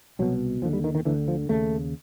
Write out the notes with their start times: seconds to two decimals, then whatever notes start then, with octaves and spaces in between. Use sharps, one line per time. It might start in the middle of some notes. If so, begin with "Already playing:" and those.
0.19 C2 B2 F#3
0.62 D#2 F3
0.65 D3
0.73 G3
0.84 D#3
0.95 D#3
1.05 D2 D3 E3
1.28 F3
1.49 D#2 C#3 A3